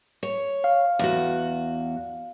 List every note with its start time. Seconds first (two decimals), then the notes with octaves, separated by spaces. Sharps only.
0.23 C#5
0.64 F5
0.99 E2 F#4